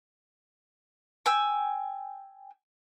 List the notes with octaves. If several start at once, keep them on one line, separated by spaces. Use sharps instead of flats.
G5 G#5 E6